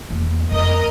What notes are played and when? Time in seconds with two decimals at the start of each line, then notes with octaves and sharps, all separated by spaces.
0.10 E2 A#3
0.52 F2 A#4 D#5